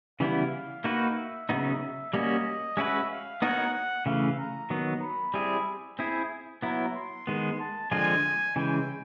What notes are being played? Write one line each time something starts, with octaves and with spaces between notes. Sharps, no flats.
C#3 E3 G3 B3 E4 F5
A#3 D#4 F#4 B4 F5
E5
C#3 F#3 B3 D#4
G3 A#3 C#4 F#4 D#5
G#3 C#4 F#4 B4 E5
F5
B3 D#4 F#4 A#4 C#5 F#5
F#5
C#3 E3 A3 F5
A#5
D#3 F#3 B3
B5
G3 C4 E4 G#4
C4 E4 G#4
F#3 B3 E4 A#5
C6
D#3 G#3 B3
A5
D3 F3 G#3 C4 F4 G#5
C#3 E3 G#3 G5